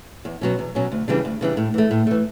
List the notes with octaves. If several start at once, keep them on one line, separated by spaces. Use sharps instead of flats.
E2
B2 F#3 C#4
E2
B2 F#3 C#4
D2
C#3 E3 G3 D4
D2
C#3 E3 G3 D4
A2
E3 A3
A2
E3 A3